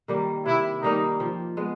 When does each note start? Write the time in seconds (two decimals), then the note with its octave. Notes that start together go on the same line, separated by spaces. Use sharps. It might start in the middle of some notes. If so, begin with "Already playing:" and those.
0.08 D#3 G3 A#3
0.46 C3 E4
0.82 D#3 G3 A#3 D#4
1.20 F3
1.57 G#3 B3